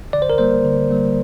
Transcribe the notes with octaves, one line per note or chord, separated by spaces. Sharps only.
D3 D5
C5
A#4
G3 A#3 C5
D3
G3 A#3